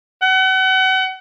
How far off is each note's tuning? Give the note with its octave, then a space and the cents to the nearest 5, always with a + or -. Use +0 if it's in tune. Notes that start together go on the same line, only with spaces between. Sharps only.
F#5 +35